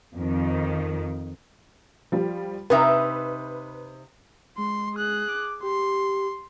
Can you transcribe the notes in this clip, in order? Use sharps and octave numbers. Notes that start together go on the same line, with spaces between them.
F2 D#3
F3 G3
C3 D#4 B4 E5
G#3 C6
G#4 F#6
D6
G4 C6